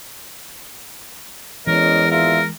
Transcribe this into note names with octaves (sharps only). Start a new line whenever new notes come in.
E2 E3 G#3 C#4 A#4 C#5 D#5
G#1 F4 A#4 E5